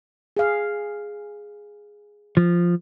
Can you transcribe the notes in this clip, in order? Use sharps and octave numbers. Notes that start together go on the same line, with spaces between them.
G#4 F5
F3